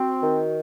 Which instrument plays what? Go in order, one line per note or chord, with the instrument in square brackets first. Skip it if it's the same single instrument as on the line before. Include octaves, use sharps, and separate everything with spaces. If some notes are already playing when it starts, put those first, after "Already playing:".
Already playing: [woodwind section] C4 [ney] F#4
[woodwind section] D#3